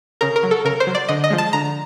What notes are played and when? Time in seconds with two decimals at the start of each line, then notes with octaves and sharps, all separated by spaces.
0.21 C#3 A#4
0.36 A#4
0.43 F#3
0.51 A4
0.65 C#3 A#4
0.80 C5
0.87 F#3
0.95 D5
1.08 D3 D#5
1.24 D#5
1.30 F3 G#3
1.38 A5
1.53 D3 A#5